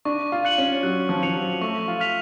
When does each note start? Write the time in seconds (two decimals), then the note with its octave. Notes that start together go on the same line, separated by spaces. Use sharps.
0.05 D4 C#6
0.32 F4
0.45 F#6 C#7 F#7
0.58 C#4
0.83 F#3 F#6
1.09 F3
1.23 F3 C#7 F7
1.35 F#3
1.61 A3 C#6
1.88 F4
2.00 F6 B6 F7